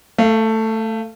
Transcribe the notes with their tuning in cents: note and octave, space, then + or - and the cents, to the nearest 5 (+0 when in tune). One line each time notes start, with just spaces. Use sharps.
A3 +10 F5 -25